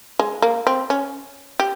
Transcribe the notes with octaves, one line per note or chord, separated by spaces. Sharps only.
G#3
A#3
C4
C#4
G4